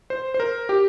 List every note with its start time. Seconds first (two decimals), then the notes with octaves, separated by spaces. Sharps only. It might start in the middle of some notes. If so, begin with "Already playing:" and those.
0.10 C5
0.34 C5
0.40 A#4
0.69 G4